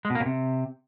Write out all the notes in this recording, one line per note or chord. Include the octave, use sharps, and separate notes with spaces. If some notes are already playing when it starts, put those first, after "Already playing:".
G#3
B2
A#3
B2
C3